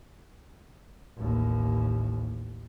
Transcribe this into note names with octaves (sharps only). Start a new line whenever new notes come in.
A1 D#2